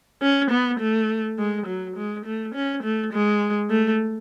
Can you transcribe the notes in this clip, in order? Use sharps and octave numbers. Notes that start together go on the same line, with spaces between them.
C#4
B3
A3
G#3
F#3
G#3
A3
C#4
A3
G#3
A3